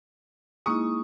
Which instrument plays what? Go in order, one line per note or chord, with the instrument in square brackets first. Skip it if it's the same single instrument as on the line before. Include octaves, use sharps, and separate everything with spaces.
[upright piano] G#3 C#6 D#6 [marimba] A#3 D#4 E4